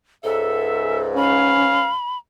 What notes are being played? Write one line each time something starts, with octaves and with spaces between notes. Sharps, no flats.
C#2 G#2 A4 E5
C#4 F5 B5